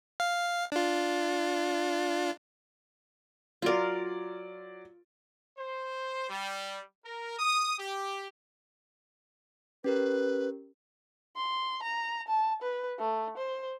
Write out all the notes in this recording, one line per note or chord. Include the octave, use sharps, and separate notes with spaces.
F5
D4 F4
F#3 F4 A#4 D5
C5
G3
A#4
D#6
G4
C#4 G4 A#4 B4
C6
A#5
A5
B4
A3
C5